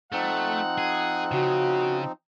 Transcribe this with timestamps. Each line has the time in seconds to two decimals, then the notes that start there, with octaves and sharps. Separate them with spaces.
0.12 F3 A3 C4 D#4 F#5
0.78 G#4
1.32 C#3 F#4